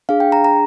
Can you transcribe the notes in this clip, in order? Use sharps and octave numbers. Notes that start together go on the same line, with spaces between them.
D4 G#4 F5
G5
A#5
A#5